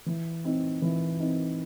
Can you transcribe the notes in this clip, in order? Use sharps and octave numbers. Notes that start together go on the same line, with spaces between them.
E3
C4 D#4
E3
C4 D#4